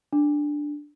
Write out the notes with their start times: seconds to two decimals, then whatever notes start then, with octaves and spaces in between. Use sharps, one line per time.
0.13 D4